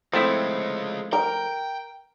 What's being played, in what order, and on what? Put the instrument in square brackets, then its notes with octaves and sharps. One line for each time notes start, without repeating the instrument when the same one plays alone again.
[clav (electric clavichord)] F3 A3 E4 [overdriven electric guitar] G#3 F4 [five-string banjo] C4
[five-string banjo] A#4 [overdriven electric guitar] G5